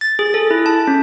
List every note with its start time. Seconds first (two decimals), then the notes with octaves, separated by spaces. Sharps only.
0.01 A6
0.19 G#4
0.34 A4
0.51 E4
0.66 A5
0.87 C#4